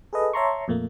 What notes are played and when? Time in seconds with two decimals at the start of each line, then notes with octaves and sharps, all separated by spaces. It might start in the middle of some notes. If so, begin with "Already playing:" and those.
0.13 G#4 A4 B4 D#5
0.33 C#5 E5 A5 A#5 C6 C#6
0.68 F2 A#2 A3 A#3